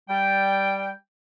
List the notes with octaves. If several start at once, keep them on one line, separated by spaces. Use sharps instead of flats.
G3 G5